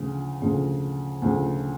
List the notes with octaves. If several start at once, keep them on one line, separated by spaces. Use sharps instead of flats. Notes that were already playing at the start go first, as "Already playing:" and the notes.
Already playing: D2 C#3 F3
D2 C#3 F3
D2 C#3 F3